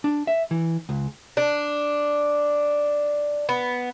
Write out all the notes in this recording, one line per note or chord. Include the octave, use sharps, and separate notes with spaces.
D4
E5
E3
C#2
D4
B3